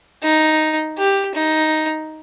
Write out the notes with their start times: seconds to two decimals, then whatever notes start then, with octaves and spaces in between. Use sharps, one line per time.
0.23 D#4
0.98 G4
1.35 D#4